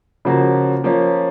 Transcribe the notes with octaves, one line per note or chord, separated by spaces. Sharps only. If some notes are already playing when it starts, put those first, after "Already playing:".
C#3 F3 A#3 C#4 F#4
F3 A#3 C#4